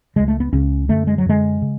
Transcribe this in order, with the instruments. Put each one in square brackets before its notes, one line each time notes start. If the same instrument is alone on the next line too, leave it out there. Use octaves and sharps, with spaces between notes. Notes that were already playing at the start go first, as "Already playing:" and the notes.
[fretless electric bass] C#2 C#3 G#3
A3
B3
C#2 C#3 C#4
F#2 D3 A3
G#3
F#3
F#2 D3 G#3
C#3